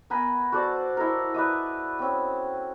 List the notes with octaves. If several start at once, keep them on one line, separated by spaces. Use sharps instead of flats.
B3 A#4 G#5 B5
F#4 A4 C5 D5
E4 A4 A#4
B4 D5 E5 D#6
C4 C#4